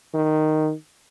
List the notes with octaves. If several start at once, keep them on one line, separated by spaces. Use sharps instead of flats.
D#3